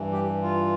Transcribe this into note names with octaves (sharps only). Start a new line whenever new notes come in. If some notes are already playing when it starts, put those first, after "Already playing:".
Already playing: G2 E3
G4
F4